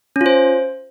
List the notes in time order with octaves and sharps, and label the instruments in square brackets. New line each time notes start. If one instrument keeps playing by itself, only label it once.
[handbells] C#4
F4
C5